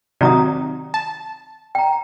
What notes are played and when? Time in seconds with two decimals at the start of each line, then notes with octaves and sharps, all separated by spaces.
0.21 C3 D#3 F#3 D5 A#5 D#6
0.94 A5
1.75 G5 A#5